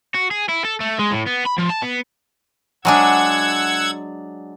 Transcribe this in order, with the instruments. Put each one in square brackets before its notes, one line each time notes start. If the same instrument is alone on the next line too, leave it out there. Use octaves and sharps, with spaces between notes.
[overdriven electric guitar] F#4
G#4
E4
A4
A3
G#3
A2
B3
B5
F3
A5
B3
[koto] F#3 G#3 D4 [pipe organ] F#5 E6 G#6